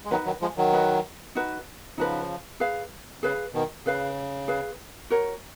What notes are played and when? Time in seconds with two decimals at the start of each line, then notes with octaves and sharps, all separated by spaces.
0.05 G#3
0.11 D#3 F#3 D#4 F#4 B4
0.26 D#3 F#3
0.41 F3 G#3
0.57 D#3 F#3
0.73 D#4 F#4 B4
1.35 D#4 F#4 B4
1.98 C#3 F3 D#4 F#4 B4
2.60 G#4 B4 F5
3.23 C#3 G#4 B4 F5
3.54 B2 D#3
3.86 C#3 G#4 B4 F5
4.48 G#4 B4 F5
5.10 F#4 A#4 C#5